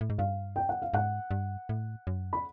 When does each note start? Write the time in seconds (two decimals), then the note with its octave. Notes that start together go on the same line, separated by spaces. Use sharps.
0.01 A2
0.10 G#2
0.18 G2 F5
0.56 G5
0.69 F#5
0.82 F5
0.94 G#2 F#5
1.31 G2
1.69 A2
2.07 F#2
2.33 B5